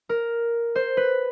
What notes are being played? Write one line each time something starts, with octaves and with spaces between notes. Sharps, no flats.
A#4
C5
B4